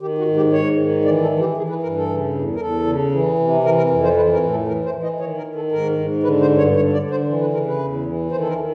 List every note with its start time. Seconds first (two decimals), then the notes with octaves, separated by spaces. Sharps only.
0.01 D#3 G4
0.18 F#4
0.28 G#2
0.36 G4
0.52 G#2 C#5
0.80 D#3
1.05 E3 D5
1.22 A4
1.31 E3
1.40 G4
1.57 E3 G#4
1.69 B4
1.83 G2 A#4
1.96 A4
2.09 C#3
2.34 E2
2.56 A#4
2.60 E2 A4
2.86 C#3
3.12 E3
3.39 C3
3.64 E3 A#4
3.77 A#4
3.90 F2
4.04 C5
4.16 E3 B4
4.33 A#4
4.42 A2
4.51 A4
4.68 E3 A#4
4.85 C5
4.94 E3
5.03 D#5
5.20 D#3 C#5
5.37 A#4
5.46 D#3
5.55 A4
5.72 G#2 A#4
5.98 G#2
6.23 D3 B4
6.41 C5
6.50 G2
6.58 C#5
6.76 D3 C#5
6.93 D5
7.01 D3
7.11 C5
7.27 E3
7.41 B4
7.53 C#3 A#4
7.67 B4
7.79 E2
8.06 E3
8.31 D#3 C5
8.40 A4
8.49 A#4
8.57 D#3